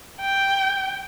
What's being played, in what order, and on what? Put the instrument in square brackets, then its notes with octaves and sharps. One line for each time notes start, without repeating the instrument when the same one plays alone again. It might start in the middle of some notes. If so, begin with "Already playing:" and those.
[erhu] G5